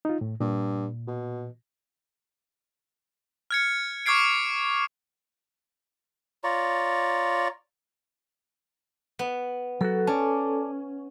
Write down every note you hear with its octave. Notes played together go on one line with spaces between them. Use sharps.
D#4 F4
A2
G2 A#2
B2
F6 G#6 C#7
C#6 D6 F6 G#6 C7 D7
F4 C#5 D5 A#5
B3
F#3 F#4 A4
C#4 D5 A5